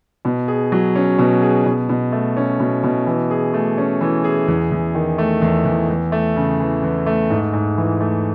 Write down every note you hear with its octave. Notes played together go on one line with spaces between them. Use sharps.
B2
G#4
F#3
C#4
B2
G#4
B2
B2
A3
C#4
B2
B2
E3
G#4
A3
C#4
E3
G#4
E2
E2
D#3
A3
E2
E2
E2
A3
C#3
E3
E2
A3
G#2
G#2
E3
A3